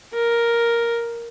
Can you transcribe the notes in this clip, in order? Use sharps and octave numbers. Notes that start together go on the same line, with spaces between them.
A#4